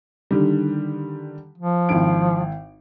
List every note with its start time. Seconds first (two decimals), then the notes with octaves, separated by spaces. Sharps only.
0.31 D3 D#3 G3
1.58 F3
1.89 G#1 E4 D7